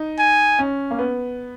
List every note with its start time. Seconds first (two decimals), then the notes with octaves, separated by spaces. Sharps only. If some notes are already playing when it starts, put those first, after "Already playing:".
Already playing: D#4
0.19 G#5
0.59 C#4
0.91 A#3
0.99 B3